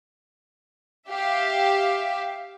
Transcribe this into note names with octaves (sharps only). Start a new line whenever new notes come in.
G4 E5 F5